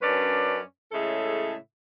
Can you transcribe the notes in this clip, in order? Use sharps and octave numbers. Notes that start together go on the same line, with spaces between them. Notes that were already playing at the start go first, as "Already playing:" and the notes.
F#2 C#4 D4 B4 D5
A2 C#3 G#3 A4 E5